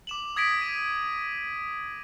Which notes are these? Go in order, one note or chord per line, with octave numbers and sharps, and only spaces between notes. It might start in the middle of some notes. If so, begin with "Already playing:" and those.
D6 E7 F#7
D#6 G#6 A#6 B6 D7
D#7